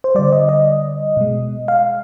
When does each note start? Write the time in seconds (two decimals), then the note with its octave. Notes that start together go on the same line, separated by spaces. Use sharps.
0.04 C5
0.15 D3 G3 D5
0.32 D#5
0.49 D#5
1.17 B2 G#3
1.68 F5